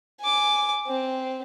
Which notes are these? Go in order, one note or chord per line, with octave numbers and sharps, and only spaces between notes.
G#5 D6
C4